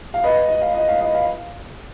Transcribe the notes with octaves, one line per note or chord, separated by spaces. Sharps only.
F5
B4 D#5
D#5
F5
D#5
F5
D#5
F5